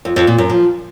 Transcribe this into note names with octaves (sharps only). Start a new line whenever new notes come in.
F2
F2
A#2
F#2
F3